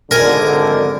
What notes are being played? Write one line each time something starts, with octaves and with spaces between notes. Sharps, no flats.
G#1 D3 A#4 G#5